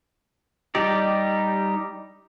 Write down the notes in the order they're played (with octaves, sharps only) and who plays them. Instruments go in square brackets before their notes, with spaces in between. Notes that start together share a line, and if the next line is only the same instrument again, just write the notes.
[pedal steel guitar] G3 D#4 G4 D5